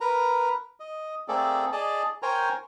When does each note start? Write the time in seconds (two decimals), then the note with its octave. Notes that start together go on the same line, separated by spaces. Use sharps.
0.01 A#4 B4 A#5
0.80 D#5
1.28 A3 A#3 C4 G#4 A4 D5
1.72 G#4 D5 D#5 A5
2.22 A#4 C5 C#5 G5 G#5 A#5